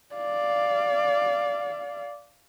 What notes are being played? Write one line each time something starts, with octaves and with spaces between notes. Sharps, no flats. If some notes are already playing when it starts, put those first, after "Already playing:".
D5 F5